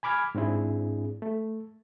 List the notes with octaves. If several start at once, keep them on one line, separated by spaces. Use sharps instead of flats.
G#5 B5 D6 F6 G#6
G#2 C4 D4 E4 G#4
A3